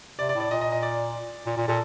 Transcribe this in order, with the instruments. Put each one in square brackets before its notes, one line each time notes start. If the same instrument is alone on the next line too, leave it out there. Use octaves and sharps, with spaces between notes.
[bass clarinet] C3 [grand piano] D5
[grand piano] D5
[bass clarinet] A2
[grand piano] D5
[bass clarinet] A#2 [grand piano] D#5
[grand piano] D#5
D#5
D5
[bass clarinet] A#2
A#2
[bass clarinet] A#2 [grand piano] A4